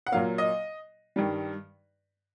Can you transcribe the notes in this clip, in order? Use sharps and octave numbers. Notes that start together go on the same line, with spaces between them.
F#5
A#2 F#3 A#3 F5
D#5
G2 D#3 G3